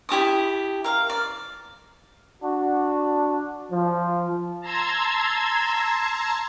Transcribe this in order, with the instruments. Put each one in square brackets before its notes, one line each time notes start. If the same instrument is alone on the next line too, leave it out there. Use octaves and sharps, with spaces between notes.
[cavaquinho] E4 G4 A5 D#6
A#4 F5
D5
[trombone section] D4 F#4
F3
[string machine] A5 A#5 C6 E6 G#6